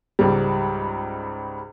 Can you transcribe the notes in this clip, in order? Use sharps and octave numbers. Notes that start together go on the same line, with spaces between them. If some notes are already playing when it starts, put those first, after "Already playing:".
C#2 G#2 G3